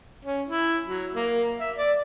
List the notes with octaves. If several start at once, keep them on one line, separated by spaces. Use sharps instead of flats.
C#4
E4
F#3
A#3
E5
D5